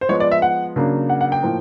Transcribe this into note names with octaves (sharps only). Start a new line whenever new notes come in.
C5
F3 G#3 B3 C#5
D5
E5
F#5
C#3 F#3 A#3 D4
F#5
F#5
G5
A2 F3 A#3